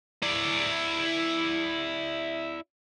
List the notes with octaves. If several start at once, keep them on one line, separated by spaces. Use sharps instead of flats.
E4 D5